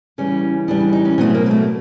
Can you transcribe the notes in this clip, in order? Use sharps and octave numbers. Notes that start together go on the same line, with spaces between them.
C#3 E3 G3 C#4
C#3 E3 G3 D4
D4
D#4
C#4
B2 F#3 A3 C4
A#3
A#3
A3